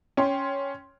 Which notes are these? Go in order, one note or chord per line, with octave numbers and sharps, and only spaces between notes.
C#4 G5 C6